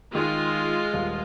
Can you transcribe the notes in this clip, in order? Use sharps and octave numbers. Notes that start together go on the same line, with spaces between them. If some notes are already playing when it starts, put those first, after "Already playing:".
D#3 G#3 F4
D#1 F5